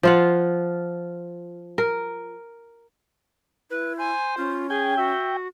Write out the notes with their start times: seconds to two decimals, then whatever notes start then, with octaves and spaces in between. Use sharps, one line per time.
0.03 F3 F4 F#5
1.78 A#4
3.71 E4 B4
3.98 C5 G#5
4.37 C#4 F4
4.70 G#4 G5 G#5
4.98 F#4 E5